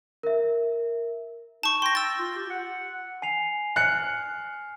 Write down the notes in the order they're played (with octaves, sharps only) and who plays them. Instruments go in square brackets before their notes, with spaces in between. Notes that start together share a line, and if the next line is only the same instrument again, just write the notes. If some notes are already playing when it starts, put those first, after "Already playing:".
[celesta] A#4 E5
[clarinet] D#4 [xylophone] A5 C#6
[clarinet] G5 [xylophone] C6 A#6
[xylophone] E6 A6
[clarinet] F4
G4
F#5
[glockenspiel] G#5 C7 F7
[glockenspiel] F6 [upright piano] F#6 C#7